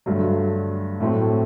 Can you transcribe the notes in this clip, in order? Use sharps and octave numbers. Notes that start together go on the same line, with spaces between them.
G2 D3 F#3 A3
A2 F#3 A3 C4